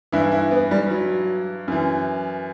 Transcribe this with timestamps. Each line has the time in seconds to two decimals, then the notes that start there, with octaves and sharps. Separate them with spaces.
0.12 G2 E3 E4
0.32 E4
0.51 B3
0.71 G3
0.91 F#3
1.68 F#2 E3